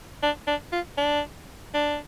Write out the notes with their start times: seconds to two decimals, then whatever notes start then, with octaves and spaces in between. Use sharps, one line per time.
0.23 D4
0.47 D4
0.72 F4
0.97 D4
1.74 D4